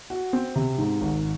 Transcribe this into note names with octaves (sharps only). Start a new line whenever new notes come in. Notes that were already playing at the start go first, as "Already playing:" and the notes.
F#4
C4
C3
G#2
G#1